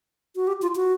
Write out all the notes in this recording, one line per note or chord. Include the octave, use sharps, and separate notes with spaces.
F#4
G4
F4
F#4